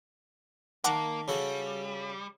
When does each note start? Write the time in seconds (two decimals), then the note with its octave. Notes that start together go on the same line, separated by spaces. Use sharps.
0.84 D#3 A#3 F#5 A5 A#5 D6
1.28 C#3 G3 F#4 A4